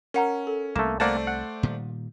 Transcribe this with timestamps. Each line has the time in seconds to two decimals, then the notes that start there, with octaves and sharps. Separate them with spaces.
0.14 C#4 A#4 F#5 A#5
0.47 A4
0.76 C2 A3 A#3 E7
1.00 A3 A#3 C5 D5 F#5 A5
1.27 F#5
1.63 A#2 D#3 G3